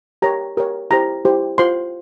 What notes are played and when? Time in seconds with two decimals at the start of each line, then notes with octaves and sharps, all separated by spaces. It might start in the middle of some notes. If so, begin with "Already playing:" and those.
0.22 G4 A#4 C#5 A#5
0.57 G4 A#4 C#5
0.90 E4 G4 C5 A#5
1.25 E4 G4 C5
1.58 F4 C5 C6